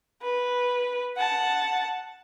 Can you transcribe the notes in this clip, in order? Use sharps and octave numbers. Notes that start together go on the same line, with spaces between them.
B4
F#5 A5